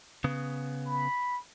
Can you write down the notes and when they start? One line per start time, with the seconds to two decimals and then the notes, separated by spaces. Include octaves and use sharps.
0.24 C#3 B3
0.86 B5